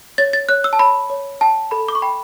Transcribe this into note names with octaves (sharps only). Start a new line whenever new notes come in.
C#5 A6
A6
C#5 F#6
E6
A5
C#5 B5
C#5
G5 A5
A4 B5
D6
C#6
G5 B5